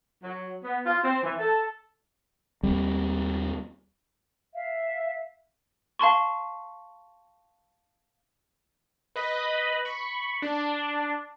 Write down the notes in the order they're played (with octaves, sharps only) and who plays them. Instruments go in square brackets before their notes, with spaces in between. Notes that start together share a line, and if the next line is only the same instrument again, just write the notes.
[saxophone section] F#3
B3
F4
C4
E3
A4
[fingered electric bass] D#2 G3 C4
[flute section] E5 F5
[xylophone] F5 A5 C6 C#6
[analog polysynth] B4 D#5 B5
B5 C#6
D4